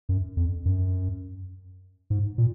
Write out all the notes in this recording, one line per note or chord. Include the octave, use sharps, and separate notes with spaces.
F#2
F2
F#2
G#2
A#2